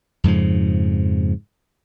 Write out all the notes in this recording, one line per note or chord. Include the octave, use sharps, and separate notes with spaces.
F2 G#2 C#3 F3